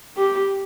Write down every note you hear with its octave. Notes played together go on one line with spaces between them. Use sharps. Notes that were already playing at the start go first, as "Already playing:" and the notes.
G4